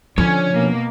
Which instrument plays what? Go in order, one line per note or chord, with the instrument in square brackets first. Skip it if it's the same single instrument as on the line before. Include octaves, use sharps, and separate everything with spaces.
[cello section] D3 [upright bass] F3 D4 [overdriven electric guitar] C#4 C#5
[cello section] B2 A#3